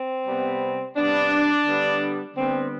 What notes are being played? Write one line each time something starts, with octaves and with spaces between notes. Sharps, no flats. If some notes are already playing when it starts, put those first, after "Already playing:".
Already playing: C4
C3 G3 B3
C3 G3 B3 D4
D3 G3 B3
D3 G3 B3 C4